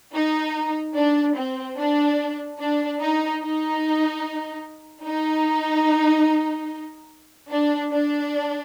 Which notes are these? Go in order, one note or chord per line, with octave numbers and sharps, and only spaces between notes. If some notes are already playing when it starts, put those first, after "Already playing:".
D#4
D4
C4
D4
D4
D#4
D#4
D#4
D4
D4